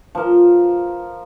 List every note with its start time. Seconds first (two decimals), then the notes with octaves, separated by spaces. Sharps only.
0.15 F3 A#4